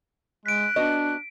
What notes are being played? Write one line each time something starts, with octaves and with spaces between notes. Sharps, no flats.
G#3 F#6 B6 D7
B3 D4 F#4 D#5